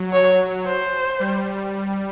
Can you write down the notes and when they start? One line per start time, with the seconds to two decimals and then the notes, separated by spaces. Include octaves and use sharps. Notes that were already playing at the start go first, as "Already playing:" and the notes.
Already playing: F#3
0.13 C#5
0.67 C5
1.20 G3